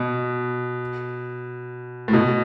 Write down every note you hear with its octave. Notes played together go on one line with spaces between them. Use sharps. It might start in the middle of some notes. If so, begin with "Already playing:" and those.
Already playing: B2
A2
B2